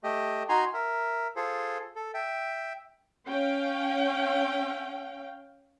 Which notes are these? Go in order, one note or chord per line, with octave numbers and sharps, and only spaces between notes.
A3 G4 D#5
D#4 F#4 G#5 A#5 C6
A#4 E5
F4 G#4 A4 C5
A4
E5 G5
C#4 F5 G5